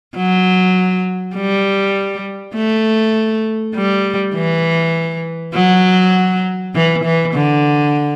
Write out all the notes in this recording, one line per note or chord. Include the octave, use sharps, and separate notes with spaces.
F#3
G3
A3
G3
E3
F#3
E3
E3
D3